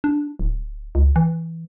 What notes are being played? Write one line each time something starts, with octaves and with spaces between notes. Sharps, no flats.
D4
D1
C#2
E3